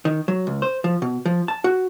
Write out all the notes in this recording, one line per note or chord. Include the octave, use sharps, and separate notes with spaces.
D#3
F#3
C#2
C5
F3
B2
F3
A5
F#4